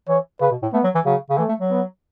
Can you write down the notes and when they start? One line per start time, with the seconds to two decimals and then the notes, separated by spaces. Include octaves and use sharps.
0.08 E3 C#5
0.41 C#3 B4
0.51 B2
0.62 A2
0.73 A3 B3
0.84 F#3
0.95 E3
1.05 C#3 F#3
1.30 C#3
1.38 E3 A3
1.49 A3
1.60 F#3
1.71 B3